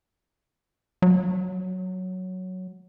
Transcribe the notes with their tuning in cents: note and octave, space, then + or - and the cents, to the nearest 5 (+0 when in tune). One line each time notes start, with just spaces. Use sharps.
F#3 +0